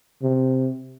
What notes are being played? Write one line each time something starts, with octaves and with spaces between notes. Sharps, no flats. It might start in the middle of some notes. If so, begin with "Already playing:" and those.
C3